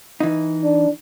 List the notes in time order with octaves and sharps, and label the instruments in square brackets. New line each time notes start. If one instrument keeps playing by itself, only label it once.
[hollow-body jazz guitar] E3 D#4
[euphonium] D4